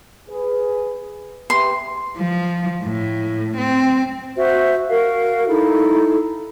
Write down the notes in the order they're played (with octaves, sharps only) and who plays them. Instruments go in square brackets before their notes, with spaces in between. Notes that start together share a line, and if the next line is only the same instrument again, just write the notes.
[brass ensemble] G#4 B4
[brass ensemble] G4 B4 E5 [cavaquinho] C6
[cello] F3
A2
C4
[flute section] F#4 C5 E5
F#4 A#4 F5
D#4 E4 A4